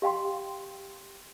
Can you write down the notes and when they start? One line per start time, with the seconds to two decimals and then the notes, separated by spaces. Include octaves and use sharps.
0.02 G4 F5 G5 C6